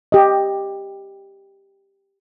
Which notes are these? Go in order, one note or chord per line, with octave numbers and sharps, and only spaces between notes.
G4 D#5